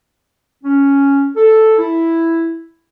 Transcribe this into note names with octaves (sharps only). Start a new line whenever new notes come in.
C#4
A4
E4